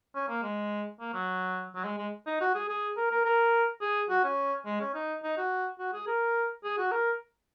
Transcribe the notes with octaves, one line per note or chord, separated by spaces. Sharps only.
C#4
A#3
G#3
A#3
F#3
F#3
G#3
G#3
D#4
F#4
G#4
G#4
A#4
A#4
A#4
G#4
F#4
C#4
G#3
C#4
D#4
D#4
F#4
F#4
G#4
A#4
G#4
F#4
A#4